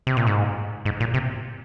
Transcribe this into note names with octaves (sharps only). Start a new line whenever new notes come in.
C3
A#2
G#2
G#2
A#2
C3